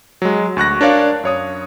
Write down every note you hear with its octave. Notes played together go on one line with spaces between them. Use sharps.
F#3 G#3
D2 C#6 F#6 A#6
D4 A#4 C#5 D5 F5
F#2 C#5 D#6